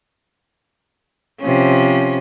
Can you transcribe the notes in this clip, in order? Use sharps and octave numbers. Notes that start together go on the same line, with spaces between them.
C3 F3 C#4